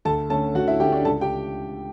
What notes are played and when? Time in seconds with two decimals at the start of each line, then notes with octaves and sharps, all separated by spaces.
0.05 D2 A4 A5
0.30 D3 A3 C#4 A4 A5
0.55 D2 F#4 F#5
0.68 E4 E5
0.80 D3 A3 C#4 G4 G5
0.92 D4 D5
1.05 C#2 A4 A5
1.21 G4 G5